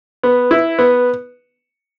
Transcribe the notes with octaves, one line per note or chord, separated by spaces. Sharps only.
B3
E4
B3